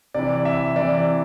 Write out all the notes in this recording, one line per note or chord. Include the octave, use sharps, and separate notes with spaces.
C3 E3 D5
E5
C3 E3 D5